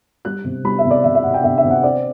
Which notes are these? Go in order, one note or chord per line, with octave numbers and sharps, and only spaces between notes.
G3 F#6
C3
G3 B5
E5
C3
D5
C3 E5
E5
C3 F#5
G5
C3 E5
E5
C3
F#5
C4 D5